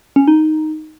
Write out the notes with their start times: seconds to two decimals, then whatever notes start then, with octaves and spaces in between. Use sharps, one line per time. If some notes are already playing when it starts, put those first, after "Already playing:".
0.16 C#4
0.28 D#4